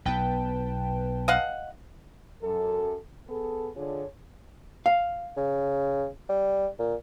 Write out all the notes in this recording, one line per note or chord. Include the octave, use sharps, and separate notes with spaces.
B1 B3 B4 G5 A5
D#5 F5 F#5
F#2 A4
B3 G#4 A4
D3 D4 F4 G#4 C#5
F5
C#3
G3
A#2